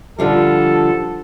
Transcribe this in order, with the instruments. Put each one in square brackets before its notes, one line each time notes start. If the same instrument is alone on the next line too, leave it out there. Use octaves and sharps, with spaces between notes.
[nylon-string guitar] D3 F3 G3 [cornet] A4